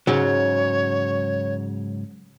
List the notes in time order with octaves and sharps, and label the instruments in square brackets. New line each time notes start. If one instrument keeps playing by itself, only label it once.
[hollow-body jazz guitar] G#2 C#3 F#3 [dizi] C#5